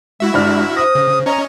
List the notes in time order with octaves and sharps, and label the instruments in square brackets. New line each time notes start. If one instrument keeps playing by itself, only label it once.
[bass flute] G#3 [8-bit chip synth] E4 F#4 E5
[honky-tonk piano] G1 D4 F6 [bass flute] G#3
[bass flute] C5 [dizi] D#6 [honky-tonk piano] A#6
[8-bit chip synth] C#3
[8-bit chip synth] C#4 C#5 D#5 [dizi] A#5